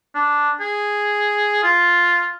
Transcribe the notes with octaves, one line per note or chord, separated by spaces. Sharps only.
D4
G#4
F4